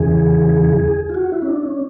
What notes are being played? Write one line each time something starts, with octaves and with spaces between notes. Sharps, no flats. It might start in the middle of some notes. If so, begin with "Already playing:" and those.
Already playing: E2 C#3 E3 G#4
F4
F#4
E4
C#4
D4
C#4